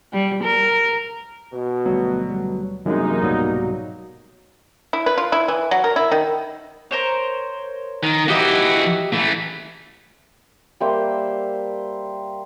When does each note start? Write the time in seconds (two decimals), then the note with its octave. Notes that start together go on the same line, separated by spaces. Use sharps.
0.13 G3
0.43 A#4
1.53 B2
1.86 D2 F#3 G3 B3
2.30 G3
2.86 F#2 C3 E3 G3 G#3 A#3 D4 D#4
3.23 C2 G#2 B2 F#3 G3
4.93 E4
5.06 B4
5.18 F4
5.32 E4
5.48 E3
5.71 F#3
5.84 A#4
5.96 E4
6.12 D#3
6.91 A#4 C5 C#5
8.03 D#3
8.28 E3 F#4 G4 D#5 E5
9.13 E3 A3
10.80 G3 A#3 C5 E5